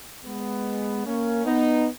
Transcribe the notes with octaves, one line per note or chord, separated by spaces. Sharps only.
G#3 B3
A#3 C#4
B3 D#4